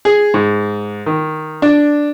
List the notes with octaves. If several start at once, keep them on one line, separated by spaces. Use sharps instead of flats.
G#4
G#2
D#3
D4